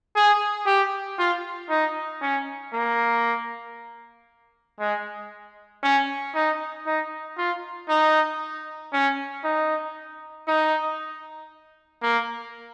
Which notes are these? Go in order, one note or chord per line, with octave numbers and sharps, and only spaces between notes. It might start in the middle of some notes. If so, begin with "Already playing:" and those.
G#4
G4
F4
D#4
C#4
A#3
G#3
C#4
D#4
D#4
F4
D#4
C#4
D#4
D#4
A#3